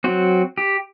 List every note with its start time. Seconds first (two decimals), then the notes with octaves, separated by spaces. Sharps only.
0.04 F#3 C4 F#4
0.57 G4